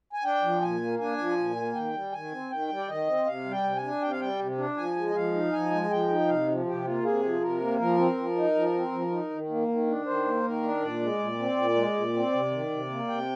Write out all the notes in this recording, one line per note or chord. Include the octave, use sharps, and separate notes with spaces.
G#5
D4 G5
F3
A#2 G#5
A#3
D4 G#5
F3
A#2
A#3
D#3 G5
G3
D#3 G#5
C4
D#3 G5
G3
D5
D#3 D#5
C4
C3 F5
G3
G5
C3
G#5
D4
C3 G5
F5
G3 G5
C3
D4
F3 G#5
G#3
D#5
F3 F5
D#4
F3 G#5
G#3
F3 G5
D#4
C3 F5
F3
C3 G4
A#3 F4
C3 G#4
F3
C3 A#4
A#3
F3 A#4
C4
F3
D#4
F3
C4
F3
D#4
D#3
A#3
D#3
D4
D#3 C5
A#3
D#3 A#4
D4
A#2 D5
G#3
A#2
C4
A#2
G#3
A#2
C4
C3
D#3
C3
A#3
C3 G5